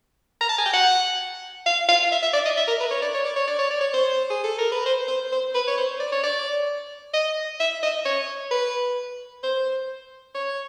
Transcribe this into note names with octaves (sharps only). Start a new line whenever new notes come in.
A#5
A5
G#5
G5
F#5
F5
F5
E5
E5
D5
D#5
E5
A#4
B4
C#5
D5
C#5
D5
C#5
D5
C#5
D5
C#5
C5
G#4
A4
A#4
B4
C5
C5
C5
B4
C#5
C5
D5
C#5
D5
D#5
E5
D#5
C#5
B4
C5
C#5